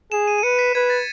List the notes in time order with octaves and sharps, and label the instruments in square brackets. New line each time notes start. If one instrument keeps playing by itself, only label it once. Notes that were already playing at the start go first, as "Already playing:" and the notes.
[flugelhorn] G#4 [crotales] E7
[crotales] D#7
D#7
[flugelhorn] B4 [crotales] C#7
[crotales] B6
[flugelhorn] B4 [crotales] G#6
[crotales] A6